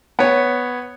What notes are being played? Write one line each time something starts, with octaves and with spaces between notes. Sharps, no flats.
B3 C#5